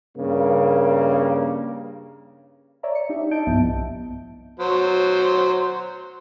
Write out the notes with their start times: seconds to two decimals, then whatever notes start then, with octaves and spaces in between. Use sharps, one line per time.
0.18 G2 C#3 A#3
2.83 C#5 D5 E5 A#5
2.95 C#7
3.09 D4 D#4 G4 E5
3.31 E4 D#5 A5 G6 D7
3.47 B1 G2 F3 B3 E5 A5
4.60 F#3 C5